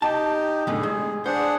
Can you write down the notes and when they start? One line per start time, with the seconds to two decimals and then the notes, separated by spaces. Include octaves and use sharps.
0.02 D#4 G4 A5
0.67 E2 A2 D3 G#4
0.83 G#3
1.26 D4 G#4 C5 F#5